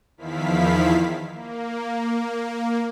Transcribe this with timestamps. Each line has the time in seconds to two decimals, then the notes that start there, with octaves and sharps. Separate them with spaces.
0.18 E2 D#3 F3 E4 F5 B6
1.32 A#3